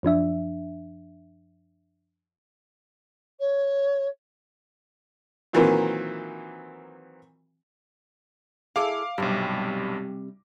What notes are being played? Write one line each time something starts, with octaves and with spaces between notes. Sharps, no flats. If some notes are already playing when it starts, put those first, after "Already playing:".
F#2 F3 D4 E5
C#5
A#2 D#3 E3 F#3 A#3 C4
E4 G#4 A4 F5 D6
B1 G2 C3 G3